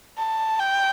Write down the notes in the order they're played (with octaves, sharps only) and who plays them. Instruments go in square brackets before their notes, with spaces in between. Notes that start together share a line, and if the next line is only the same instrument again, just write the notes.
[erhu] A5
G5